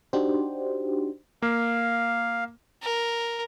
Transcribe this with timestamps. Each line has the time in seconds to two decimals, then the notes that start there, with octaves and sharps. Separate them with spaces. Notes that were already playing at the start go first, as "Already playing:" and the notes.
0.13 D4 D#4 F#4 G4 C5
1.42 A#3 F5
2.82 A#4